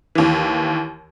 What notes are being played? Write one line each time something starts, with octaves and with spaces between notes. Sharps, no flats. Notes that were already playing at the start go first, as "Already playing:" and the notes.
D#2 E3